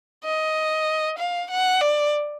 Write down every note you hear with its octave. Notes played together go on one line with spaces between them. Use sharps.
D#5
F5
F#5
D5